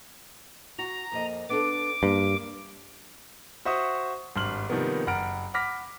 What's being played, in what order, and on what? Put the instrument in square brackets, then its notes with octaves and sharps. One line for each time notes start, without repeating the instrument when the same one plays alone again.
[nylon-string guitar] F#4 [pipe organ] A#5
[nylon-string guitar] F2 A#3 D#5
[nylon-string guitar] B3 D4 A4 [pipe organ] D6
[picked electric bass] G2 [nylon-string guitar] A#3
[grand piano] F#4 C5 E5 C#6 D#6
G#1 G2 C6 F6 F#7
C3 D#3 F3 G3 A#3 B3
F#1 F#5 A#5 B5 F6 D7
F#5 B5 D6 F6 A#6 B6